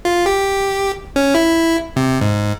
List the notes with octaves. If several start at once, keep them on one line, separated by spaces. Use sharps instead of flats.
F4
G4
C#4
E4
C3
G#2